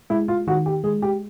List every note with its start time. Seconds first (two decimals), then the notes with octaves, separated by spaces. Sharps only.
0.10 G#3 E4
0.28 F4
0.47 D#3 F#4
0.66 G4
0.84 G#3 G#4
1.02 G4